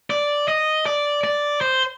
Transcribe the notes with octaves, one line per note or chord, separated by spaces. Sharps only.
D5
D#5
D5
D5
C5